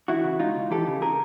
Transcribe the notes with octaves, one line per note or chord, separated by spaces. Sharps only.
E3 E4 F#4
C#3
C#2 D#4 F4
C#2
E3 G4 A4
C#3
G#4 A#4